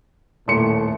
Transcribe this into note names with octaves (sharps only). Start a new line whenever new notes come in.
D#1 A2 C6 C#7